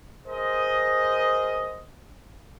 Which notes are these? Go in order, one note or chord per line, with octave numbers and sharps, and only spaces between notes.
G#4 A#4 C5 D#5